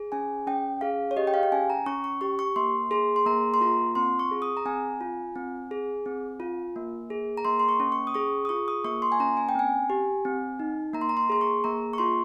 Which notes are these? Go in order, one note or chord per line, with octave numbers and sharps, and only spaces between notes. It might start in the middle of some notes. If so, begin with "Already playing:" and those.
Already playing: G#4
C#4 G#5
C#4 G5
G#4 F5
C#5
G4 D#5
G5
F5
G5
C#4 G#5
A#5
C#4 C#6
C#6
G4 C#6
C#6
A#3 C6
G#4 C6
C6
A#3 A#5
C6
F4 A#5
C4 C6
C#6
G#4
D#6
A#5
C4 G#5
F4
C4
G#4
C4
F4
A#3
G#4
A#5
A#3 C6
C6
C#6
C#4
C#6
D#6
G#4 C#6
D#6
F4 C#6
D#6
A#3 C#6
C6
G#5
C#4 A#5
G#5
G5
C4 G#5
G4
C4
D#4
A#3 A#5
C6
A#5
C6
G#4 C6
C#6
A#3 A#5
C#6
F4 C6